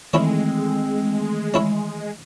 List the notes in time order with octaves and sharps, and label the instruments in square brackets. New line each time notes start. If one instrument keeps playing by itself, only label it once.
[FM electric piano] D#3 E3 A3 [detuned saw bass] G#3 [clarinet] C4 [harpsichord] C#4 E4 C#5
[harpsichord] C#4 E4 C#5